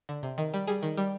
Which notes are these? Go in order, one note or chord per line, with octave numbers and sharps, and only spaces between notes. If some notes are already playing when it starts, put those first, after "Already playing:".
D3
C3
D#3
G3
G3 G#4
D#3
G3